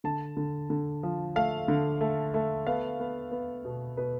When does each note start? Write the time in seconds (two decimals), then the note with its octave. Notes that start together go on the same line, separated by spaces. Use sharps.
0.04 D3 A5
0.37 D3
0.70 D3
1.03 F3
1.36 A3 F5
1.68 D3
2.01 A3
2.34 A3
2.67 B3 F5
3.00 B3
3.31 B3
3.65 B2
3.97 B2 B4